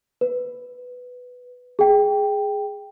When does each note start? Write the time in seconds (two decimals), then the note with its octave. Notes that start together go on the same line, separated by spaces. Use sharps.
0.21 B4
1.79 G#4 G5